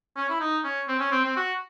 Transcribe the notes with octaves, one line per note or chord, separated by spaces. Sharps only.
C#4
E4
D#4
C#4
C4
C#4
C4
C4
F#4